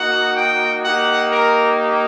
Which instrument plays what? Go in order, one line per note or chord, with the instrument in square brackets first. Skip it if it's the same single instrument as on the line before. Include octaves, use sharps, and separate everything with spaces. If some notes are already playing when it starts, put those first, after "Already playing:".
Already playing: [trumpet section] A#3 D#4 F#4 F#5
G5
A#3 D#4 G4 F#5
A#4